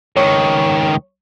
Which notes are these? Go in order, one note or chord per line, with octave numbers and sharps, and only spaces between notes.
C#2 D#3 C#5